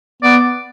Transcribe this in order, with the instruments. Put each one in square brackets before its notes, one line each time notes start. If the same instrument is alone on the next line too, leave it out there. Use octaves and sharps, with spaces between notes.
[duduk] B3 [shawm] D5